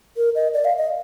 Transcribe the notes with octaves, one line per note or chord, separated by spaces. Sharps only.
A#4
D#5
D5
F5
D#5